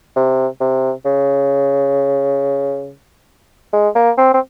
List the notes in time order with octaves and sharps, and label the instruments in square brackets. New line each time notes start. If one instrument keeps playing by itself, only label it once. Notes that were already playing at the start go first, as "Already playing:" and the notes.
[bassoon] C3
C3
C#3
G#3
A#3
C4
C4